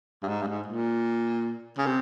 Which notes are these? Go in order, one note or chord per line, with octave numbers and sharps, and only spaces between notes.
G2
G#2
G2
G#2
A#2
C#3
C3